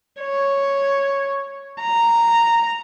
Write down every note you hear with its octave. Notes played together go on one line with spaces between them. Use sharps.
C#5
A#5